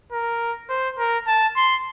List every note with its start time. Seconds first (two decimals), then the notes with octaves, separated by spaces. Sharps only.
0.12 A#4
0.69 C5
0.98 A#4
1.27 A5
1.56 C6